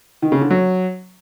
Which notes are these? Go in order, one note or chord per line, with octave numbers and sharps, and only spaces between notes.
D#3
C#3
D3
F#3